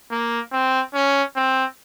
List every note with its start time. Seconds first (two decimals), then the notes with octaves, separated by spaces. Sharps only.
0.11 A#3
0.52 C4
0.94 C#4
1.36 C4